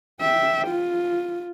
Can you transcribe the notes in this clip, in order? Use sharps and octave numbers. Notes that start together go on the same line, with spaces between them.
E5 G5
F4